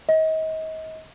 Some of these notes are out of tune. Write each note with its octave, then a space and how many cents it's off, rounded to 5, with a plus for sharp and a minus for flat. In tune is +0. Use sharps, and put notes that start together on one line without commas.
D#5 +35